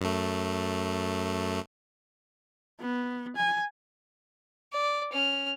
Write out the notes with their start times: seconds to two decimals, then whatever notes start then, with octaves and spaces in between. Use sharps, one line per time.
0.01 F#2 A3
2.80 B3
3.36 G#5
4.73 D5
5.12 C#4 F6